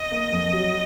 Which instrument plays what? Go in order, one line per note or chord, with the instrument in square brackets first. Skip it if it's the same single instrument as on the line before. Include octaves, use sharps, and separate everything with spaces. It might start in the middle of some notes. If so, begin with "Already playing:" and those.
Already playing: [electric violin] D#5
[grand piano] A#3
F2
F#3